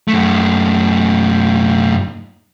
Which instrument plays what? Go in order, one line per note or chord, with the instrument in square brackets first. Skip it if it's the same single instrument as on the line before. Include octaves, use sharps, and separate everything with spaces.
[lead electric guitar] F#2 A3